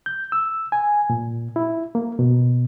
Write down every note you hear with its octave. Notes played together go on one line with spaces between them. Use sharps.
G6
E6
G#5
A#2
E4
A#3
B2